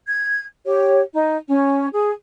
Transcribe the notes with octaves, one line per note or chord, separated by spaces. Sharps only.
G#6
G4 C#5
D#4
C#4
G#4